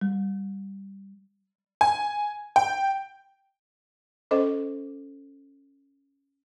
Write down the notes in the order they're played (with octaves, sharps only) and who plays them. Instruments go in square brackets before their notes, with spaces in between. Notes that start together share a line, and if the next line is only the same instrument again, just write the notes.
[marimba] G3
[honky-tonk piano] G#5
G5
[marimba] C#4 A4 C5 D#5 D6